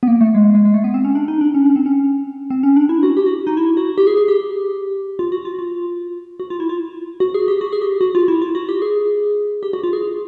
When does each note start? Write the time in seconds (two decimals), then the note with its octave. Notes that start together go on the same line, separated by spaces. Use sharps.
0.03 B3
0.07 A#3
0.21 A3
0.35 G#3
0.55 G#3
0.65 G#3
0.74 A3
0.84 B3
0.94 C4
1.05 C#4
1.15 D4
1.28 D#4
1.41 D4
1.55 C#4
1.66 C#4
1.76 C4
1.86 C#4
2.50 C4
2.63 C#4
2.76 D4
2.89 E4
3.03 F#4
3.17 G4
3.26 F#4
3.47 D#4
3.57 E4
3.77 F#4
3.98 G4
4.07 G#4
4.17 G#4
4.28 G4
5.19 F4
5.32 F#4
5.45 F4
5.59 F4
6.40 F#4
6.50 F4
6.60 E4
6.69 F4
7.20 F#4
7.34 G#4
7.48 G4
7.61 F#4
7.73 G#4
7.82 G4
8.01 F#4
8.15 F4
8.28 E4
8.42 F4
8.55 F#4
8.69 G4
8.82 G#4
9.63 G4
9.73 F#4
9.83 F4
9.93 G#4